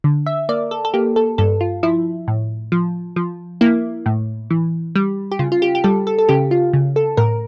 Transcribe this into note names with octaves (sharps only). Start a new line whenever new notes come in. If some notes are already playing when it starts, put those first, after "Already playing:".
D3
E5
A#3 D5
A4
A4
A#3 G4
A4
G2 A4
F4
F3 E4
A2
F3
F3
A#3 E4
A2
E3
G3
G4
C#3 F4
F4
G4
G4
G3 A4
A4
A4
C#3 G4
F4
C#3
A4
A2 A#4